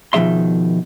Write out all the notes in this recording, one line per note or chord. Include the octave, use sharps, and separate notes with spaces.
B2 D#3 F3 G#4 E5 C6